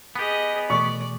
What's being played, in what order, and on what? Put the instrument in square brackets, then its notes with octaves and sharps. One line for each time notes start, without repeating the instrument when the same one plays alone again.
[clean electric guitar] B3 G4 [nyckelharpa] G#4 D#5
[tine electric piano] B2 E3 A3 [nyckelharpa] D5 [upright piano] C#6